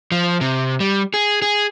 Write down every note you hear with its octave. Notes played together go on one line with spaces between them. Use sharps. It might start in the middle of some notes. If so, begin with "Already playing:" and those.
F3
C3
G3
G#4
G#4